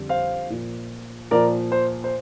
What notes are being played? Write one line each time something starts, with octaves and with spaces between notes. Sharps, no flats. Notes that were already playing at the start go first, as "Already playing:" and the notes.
Already playing: F2 D3 G3
C5 F5
A#2 F3
A#2 F3 A#4 D5
C5
C5